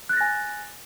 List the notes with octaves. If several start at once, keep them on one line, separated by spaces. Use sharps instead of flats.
G#5 F#6 A6 A#6